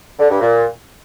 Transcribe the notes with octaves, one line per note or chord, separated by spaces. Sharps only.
D3
G2
A#2